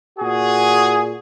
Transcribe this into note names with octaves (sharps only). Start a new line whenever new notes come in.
A#2 F#4 G#4